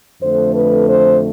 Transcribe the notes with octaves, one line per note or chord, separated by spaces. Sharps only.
F2 D3 A3 C5
B4
C5